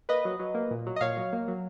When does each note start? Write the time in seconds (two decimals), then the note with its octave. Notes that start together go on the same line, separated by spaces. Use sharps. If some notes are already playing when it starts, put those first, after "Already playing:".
0.09 A#3 B4 D#5
0.25 F#3
0.39 F#3
0.55 A#3
0.71 A#2
0.86 F#3
0.96 D#5
1.01 A#2 C#5 F5
1.17 F#3
1.33 A#3
1.48 F#3